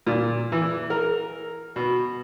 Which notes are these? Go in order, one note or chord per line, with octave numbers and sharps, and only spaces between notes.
A#2
E3
A#4
B2